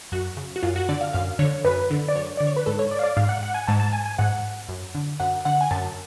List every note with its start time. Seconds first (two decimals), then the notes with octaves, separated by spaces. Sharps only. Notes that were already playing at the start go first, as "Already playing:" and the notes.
0.12 F#2 F#4
0.37 C#3
0.56 F#4
0.63 F#2 F4
0.76 F#4
0.89 D3 D5
1.01 F5
1.13 F#2 F5
1.39 D3 C#5
1.64 F#2 B4
1.90 D3
2.08 D5
2.16 F#2 C#5
2.37 D3 D5
2.47 C#5
2.57 B4
2.66 G#2 A4
2.79 C#5
2.91 D5
2.99 F5
3.04 D5
3.17 G#2 F5
3.29 F#5
3.43 F#5
3.54 G#5
3.67 G#2 A5
3.80 A5
3.92 G#5
4.06 G#5
4.18 G#2 F#5
4.69 F#2
4.95 D3
5.20 F#2 F#5
5.45 D3 F#5
5.61 G#5
5.71 F#2 A5